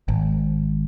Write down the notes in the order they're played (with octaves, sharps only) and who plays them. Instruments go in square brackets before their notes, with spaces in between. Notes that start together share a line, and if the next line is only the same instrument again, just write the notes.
[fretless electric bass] G#1